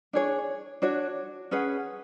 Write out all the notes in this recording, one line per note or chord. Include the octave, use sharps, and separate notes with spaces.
D4 G#4 C#5
D4 F#4 C#5
C#4 G#4 B4 F#5